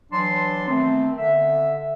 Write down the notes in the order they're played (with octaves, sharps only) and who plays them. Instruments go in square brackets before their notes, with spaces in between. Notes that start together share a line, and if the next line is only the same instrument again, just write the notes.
[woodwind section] E3 F#3 D4 A5 C6
D#3 A3 B3 C4
D3 E5